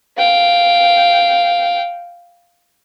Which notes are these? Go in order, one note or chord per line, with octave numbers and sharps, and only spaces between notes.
F5 G5